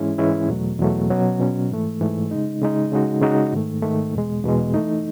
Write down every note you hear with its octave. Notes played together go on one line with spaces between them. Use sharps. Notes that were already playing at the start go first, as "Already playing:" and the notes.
Already playing: G#2 E3 G#3 C#4 E4
G#2 E3 G#3 C#4 E4
E2 B2 F#3 A3
E2 B2 F#3 A3
B2 F#3 C#4
B2 F#3 C#4
G#2 E3 A3
G#2 E3 A3
C#3 G#3 D#4
C#3 G#3 D#4
C#3 G#3 D#4 F#4
C#3 G#3 D#4 F#4
G#2 D#3 A3
G#2 D#3 A3
E2 B2 G#3
E2 B2 G#3
E3 A3 D#4